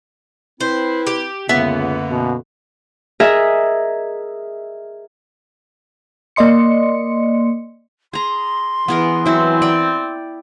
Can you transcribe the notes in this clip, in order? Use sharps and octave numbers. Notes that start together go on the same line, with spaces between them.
C4 E4 B4 C5
G4
C#2 F#2 D3 A#3 B3 E5
B2
G#4 A#4 D#5 E5
A#3 D5 D#5 C6 C#7
G#4 A#5 C6
E3 B3 G#4 A#4
F#3 C4 E4
D5 G5